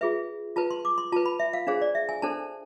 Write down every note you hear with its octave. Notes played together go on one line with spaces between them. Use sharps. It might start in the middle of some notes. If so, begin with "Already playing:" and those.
F4 G#4 B4 E5
F4 B4 A5
C6
D6
C6
F4 B4 A5
B5
E5
F5
D4 G#4 C5 F5
D5
E5
G#5
D4 A4 C5 A5